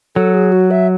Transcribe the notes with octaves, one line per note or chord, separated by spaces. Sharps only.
F#3 A4
G#4
F#4
E5